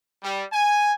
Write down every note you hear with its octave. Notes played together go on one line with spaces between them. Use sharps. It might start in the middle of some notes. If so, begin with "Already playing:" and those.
G3
G#5